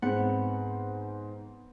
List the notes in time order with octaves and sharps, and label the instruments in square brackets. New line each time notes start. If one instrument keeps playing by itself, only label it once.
[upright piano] G#2 C4 [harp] B3 F#5